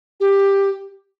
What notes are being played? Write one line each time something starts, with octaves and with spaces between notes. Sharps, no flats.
G4